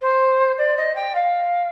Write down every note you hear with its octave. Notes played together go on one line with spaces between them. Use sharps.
C5
D5
D#5
G5
F5